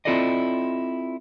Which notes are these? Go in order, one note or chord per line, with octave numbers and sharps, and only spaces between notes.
C4 E4 F4 A4 D5 D#5